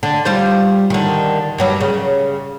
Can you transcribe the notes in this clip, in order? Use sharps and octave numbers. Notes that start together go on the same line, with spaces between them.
D3
G3 F4 C5
D3 D#3
G2 F#3 G3
C#3